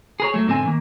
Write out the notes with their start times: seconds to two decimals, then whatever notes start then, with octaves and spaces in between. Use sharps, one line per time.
0.20 G#4 A#4 C#5
0.34 F#3 A3
0.47 B1 G#2 D3 C4 G#5
0.65 D#3 A#3